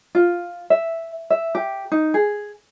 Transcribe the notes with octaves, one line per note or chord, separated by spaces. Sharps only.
F4
E5
E5
G4
D#4
G#4